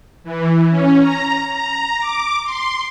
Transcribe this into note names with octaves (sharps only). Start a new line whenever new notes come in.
E3
C#4
A#5
A#5
D6
C6